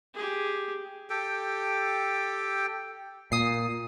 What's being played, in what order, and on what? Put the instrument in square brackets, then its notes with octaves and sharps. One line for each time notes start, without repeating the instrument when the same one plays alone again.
[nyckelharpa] G4 G#4
[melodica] G4 A4 G5
[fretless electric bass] A#2 [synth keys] D#6 C7